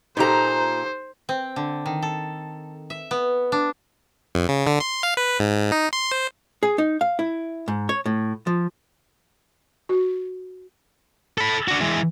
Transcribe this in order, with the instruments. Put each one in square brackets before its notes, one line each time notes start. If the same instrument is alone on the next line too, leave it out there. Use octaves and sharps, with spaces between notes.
[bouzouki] A#2 A#5 [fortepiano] D#4 G4 A4 [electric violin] C5
[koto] C4
D3
D#3
A4
E5
B3
D4
[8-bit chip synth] F2
C#3
D3
C6
F5
B4
G#2
D#4
C6
C5
[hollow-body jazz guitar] G#4
D#4
F5
E4
G#2
C#5
A2
F3
[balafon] F#4
[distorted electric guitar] A4 B5
D4 F#4
E3 G#3